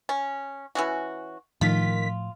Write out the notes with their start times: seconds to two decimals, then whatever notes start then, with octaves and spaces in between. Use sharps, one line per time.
0.09 C#4
0.75 E3 C#4 F#4
1.61 A2 D#3 F3 F4 B6